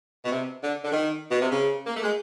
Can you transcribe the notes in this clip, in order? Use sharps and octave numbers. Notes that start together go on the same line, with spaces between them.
B2
C3
D3
D3
D#3
B2
C3
C#3
A#3
A3
G#3